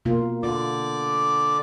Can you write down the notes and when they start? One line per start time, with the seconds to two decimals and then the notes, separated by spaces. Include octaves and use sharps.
0.05 B2 A#3 F4
0.43 D3 F4 D5 D6